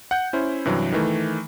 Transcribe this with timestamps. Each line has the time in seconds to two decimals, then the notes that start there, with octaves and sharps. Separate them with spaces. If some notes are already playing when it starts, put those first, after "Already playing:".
0.11 F#5 G6
0.33 C#4 E4 C5
0.65 G2 C3 E3 F#3
0.92 D#3 E3 A3